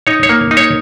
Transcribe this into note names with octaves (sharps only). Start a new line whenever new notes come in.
D#4 C#5
C#5
A#3
D#4
C#5